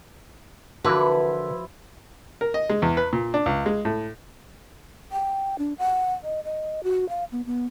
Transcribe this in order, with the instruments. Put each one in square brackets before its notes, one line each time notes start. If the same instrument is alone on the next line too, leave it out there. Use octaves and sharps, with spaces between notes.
[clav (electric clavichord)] D3 E3 A#4 [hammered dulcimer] F3 E4 [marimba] F#4 [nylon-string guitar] B4
[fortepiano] A#4
D#5
G#3
E2
B4
A#2
D4
C#2
G#3
A2
[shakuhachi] G5
D4
F#5
D#5
D#5
F#4
F5
B3
B3